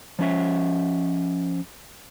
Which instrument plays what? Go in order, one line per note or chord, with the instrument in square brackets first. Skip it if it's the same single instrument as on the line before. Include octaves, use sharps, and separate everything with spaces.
[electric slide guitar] F3 C#4 E5